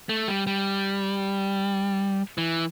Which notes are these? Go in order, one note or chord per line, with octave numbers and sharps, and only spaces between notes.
A3
G3
G3
E3